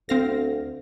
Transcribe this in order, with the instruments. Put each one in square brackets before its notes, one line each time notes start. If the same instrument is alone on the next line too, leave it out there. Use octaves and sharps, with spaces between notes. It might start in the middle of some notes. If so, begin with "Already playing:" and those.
[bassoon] D2 [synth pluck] C4 F5 A#6